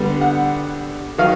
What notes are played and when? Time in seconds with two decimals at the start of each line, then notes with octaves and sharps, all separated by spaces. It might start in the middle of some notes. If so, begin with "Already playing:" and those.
Already playing: D3 G3 B3
0.21 F#5
1.18 D#3 F#3 F5